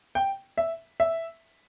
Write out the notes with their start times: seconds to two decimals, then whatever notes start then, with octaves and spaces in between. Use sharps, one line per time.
0.15 G5
0.57 E5
1.00 E5